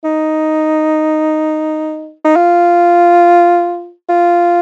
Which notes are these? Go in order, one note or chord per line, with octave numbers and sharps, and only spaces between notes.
D#4
D#4
F4
F4